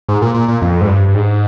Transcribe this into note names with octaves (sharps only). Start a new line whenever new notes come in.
G#2
A#2
A#2
A#2
F2
G#2
G2
G2
G#2